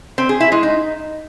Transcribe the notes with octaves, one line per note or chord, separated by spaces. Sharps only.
C4
G#4
E4
G#3
D#4